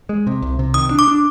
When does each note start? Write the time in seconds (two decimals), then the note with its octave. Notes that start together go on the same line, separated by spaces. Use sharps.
0.09 G#3
0.27 C3
0.42 C2
0.59 C3
0.74 D#3 D#6
0.91 D4
0.99 D6
1.08 D4